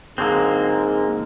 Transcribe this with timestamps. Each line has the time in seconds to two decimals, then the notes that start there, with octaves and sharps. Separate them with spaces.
0.18 G#2 D3 F#3 G#3 A#3 C4